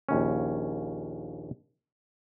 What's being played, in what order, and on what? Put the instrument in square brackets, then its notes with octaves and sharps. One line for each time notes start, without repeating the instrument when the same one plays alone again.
[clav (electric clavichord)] A#1 D#2 C#4